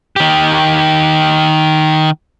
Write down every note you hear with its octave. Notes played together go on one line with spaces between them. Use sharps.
D#3 G4